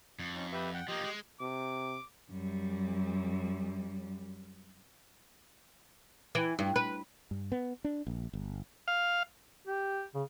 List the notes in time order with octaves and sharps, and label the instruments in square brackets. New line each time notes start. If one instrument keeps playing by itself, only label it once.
[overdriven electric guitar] F2
[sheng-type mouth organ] C#4 D#4
G4 B4 E5
F#5 G5
[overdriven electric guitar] F3 A#3 [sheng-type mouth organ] G4 D#5
[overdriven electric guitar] G#3
[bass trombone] C3 [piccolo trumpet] D6
[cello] F#2 G3
[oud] E3
G2
B4
[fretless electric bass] G2
B3
D4
A#1
G1
[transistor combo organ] F5
[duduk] G4
C#3